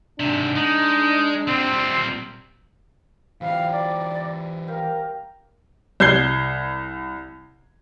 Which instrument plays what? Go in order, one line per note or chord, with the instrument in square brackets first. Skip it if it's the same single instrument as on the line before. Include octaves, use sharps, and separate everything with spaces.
[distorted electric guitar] G#2 C3 [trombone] D4
[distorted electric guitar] G#3 [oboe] D#4
[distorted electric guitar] A#2 G3 [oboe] C4
[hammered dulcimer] C3 G3 [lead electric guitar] E3 F4 [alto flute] F5
[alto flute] D5 [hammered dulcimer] A#5
[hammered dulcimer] G4 F5 [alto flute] A#4
[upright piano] C2 G6 G#6 C7 G7